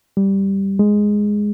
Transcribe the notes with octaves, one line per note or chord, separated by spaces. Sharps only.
G3
G#3